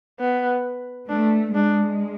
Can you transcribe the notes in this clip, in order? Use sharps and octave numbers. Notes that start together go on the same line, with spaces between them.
B3
A3 D4
G#3 D4